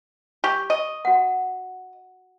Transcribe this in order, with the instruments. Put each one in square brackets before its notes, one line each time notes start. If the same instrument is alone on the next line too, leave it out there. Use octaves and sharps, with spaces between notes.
[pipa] G4 [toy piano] C#6
[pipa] D#5
[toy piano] F#4 F#5